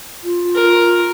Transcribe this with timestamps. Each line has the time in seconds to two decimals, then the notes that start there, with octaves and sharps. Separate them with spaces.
0.23 F4
0.55 A#4